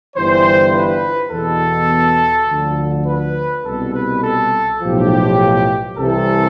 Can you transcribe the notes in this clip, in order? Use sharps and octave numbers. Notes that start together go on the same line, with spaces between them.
G1 G2 E3 C5
B4
E2 B2 A4
D2 D3 F3
B4
C2 B2 A4
B4
A4
B1 A2 F3 G4
C2 C3 E3 A4